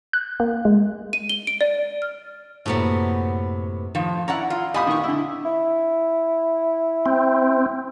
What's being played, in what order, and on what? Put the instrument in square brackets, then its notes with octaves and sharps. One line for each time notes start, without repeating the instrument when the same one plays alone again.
[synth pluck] F#6
A#3
G#3
[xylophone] D#7
G7
D7
D5
[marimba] F6
[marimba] F#2 A#3 [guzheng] A2 C3 B3
[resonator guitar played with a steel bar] A2 D#3 F3
[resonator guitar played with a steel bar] C#4 D5 F#5 [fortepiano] E4 A#5
[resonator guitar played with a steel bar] F4
[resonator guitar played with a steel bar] A#2 G4 D#5 [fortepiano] G#5 B5 D#6
[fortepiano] D#3 F#5 C#6
D3 E4
[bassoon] E4
[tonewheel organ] C4